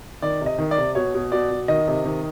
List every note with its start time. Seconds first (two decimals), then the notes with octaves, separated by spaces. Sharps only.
0.22 D#3 D5
0.41 C3
0.46 D#5
0.58 D#3
0.71 D5
0.78 C3
0.95 B2 C#5
1.15 B2
1.32 B2 D5
1.51 B2
1.68 D#3 D#5
1.88 C3
2.05 D#3